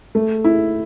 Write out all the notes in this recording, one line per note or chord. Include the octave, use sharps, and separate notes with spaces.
A3
E4